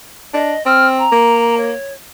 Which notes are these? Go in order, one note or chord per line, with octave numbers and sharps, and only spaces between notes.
D4 D#5
C4 F6
A#5
A#3
C#5